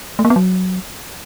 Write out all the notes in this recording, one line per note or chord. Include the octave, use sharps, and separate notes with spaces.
A3
A#3
B3
F#3